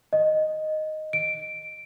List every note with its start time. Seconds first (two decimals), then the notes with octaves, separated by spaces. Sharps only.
0.13 D#5
1.13 D7